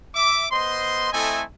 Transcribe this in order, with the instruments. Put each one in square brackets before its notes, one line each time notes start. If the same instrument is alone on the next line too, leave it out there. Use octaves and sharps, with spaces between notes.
[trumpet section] E5 D6
B3 C5 D#5 C6
A3 C4 E4 A4 D#5 G#5